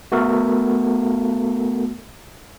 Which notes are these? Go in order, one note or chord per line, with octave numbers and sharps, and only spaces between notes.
A3 B3 F#4 A4 A#4